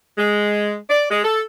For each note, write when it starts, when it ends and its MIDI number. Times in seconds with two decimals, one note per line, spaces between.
0.18 0.76 56
0.90 1.06 74
1.11 1.21 56
1.24 1.41 69